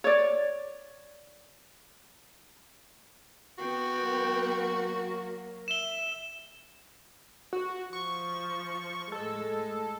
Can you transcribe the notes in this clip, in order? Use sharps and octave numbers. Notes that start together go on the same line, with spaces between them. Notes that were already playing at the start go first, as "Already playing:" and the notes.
C#5 D5
B3 F#4 G5
F#3 A#3
E5 E7 G7
F#4
F3 C#6
A2 G#3 A4